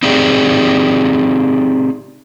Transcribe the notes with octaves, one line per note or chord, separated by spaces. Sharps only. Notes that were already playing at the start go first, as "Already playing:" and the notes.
C4 D#4 G4 G#4 D5